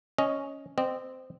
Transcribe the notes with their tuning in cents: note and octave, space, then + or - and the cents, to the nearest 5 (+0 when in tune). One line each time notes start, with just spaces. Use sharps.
C#4 +0 D#5 +0
C4 -15 D#5 -30